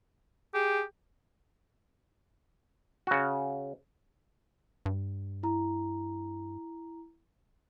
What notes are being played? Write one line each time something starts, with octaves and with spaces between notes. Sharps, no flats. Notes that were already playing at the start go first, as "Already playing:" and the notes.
G4 G#4
C#3 F#4
G2
E4 A#5